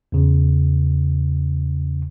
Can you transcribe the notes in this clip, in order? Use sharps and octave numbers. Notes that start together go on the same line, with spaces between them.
E2 C#3